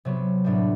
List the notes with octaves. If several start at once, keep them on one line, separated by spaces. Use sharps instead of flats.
C3 F#3 B3
A2 G3 B3 D4